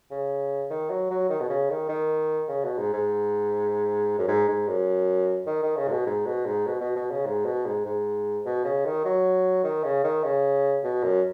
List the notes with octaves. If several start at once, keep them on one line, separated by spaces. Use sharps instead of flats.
C#3
D#3
F#3
F#3
D#3
B2
C#3
D#3
D#3
C#3
B2
G#2
G#2
F#2
G#2
G#2
F#2
D#3
D#3
C#3
G#2
B2
G#2
B2
G#2
B2
B2
B2
C#3
G#2
B2
G#2
G#2
B2
C#3
D#3
F#3
D#3
C#3
D#3
C#3
B2
F#2